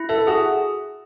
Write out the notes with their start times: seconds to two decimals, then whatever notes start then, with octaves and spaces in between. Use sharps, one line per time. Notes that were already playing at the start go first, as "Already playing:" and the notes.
Already playing: E4
0.09 A4 E5
0.27 F#4 G#4